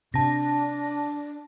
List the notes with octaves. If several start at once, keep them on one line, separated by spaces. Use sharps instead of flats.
C3 D4 A5 A#6